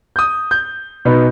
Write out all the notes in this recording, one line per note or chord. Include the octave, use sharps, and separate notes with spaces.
D#6 G6
G6
B2 B3 D#4